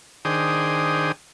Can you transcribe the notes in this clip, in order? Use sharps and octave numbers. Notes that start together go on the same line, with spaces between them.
D#3 D4 G#4 C5 G5 D#6